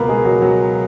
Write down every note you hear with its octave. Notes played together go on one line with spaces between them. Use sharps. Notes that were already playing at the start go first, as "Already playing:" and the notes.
Already playing: C#2 B2 A#3 B3 A#4 B4
G#3 G#4
F#3 F#4
F#3 F#4